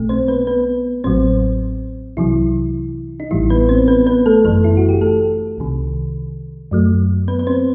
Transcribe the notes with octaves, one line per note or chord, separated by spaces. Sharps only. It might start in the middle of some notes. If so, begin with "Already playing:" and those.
Already playing: B1 B2 A3
C4 C5
B3 B4
B3 B4
A1 A2 F#3 C4 C5
C2 C3 E3 F#3 E4
D#4
A1 A2 E3 G3 E4
B3 B4
C4 C5
B3 B4
B3 B4
A3 A4
G1 F#2 E3 A3 A4
E4
F#4
G4
A3 A4
C2 C3 D#3
F#2 F#3 A3
B3 B4
B4
C4 C5